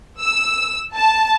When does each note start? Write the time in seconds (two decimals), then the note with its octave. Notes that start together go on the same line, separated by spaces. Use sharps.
0.21 E6
0.95 A5